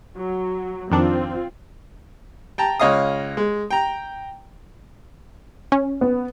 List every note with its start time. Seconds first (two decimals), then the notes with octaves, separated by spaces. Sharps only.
0.15 F#3
0.91 F2 D#3 C4 D4 F4
2.58 G5 A5 A#5
2.80 C#2 C#5 D#5 F5 D#6
3.37 G#3
3.70 G5 A#5
5.72 C#4
6.01 B3